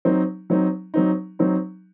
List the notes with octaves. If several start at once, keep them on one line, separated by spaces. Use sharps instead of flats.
F#3 C4 D#4
F#3 C4 D#4
F#3 C4 D#4
F#3 C4 D#4